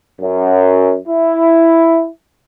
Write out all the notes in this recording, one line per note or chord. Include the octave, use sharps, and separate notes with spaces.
F#2
E4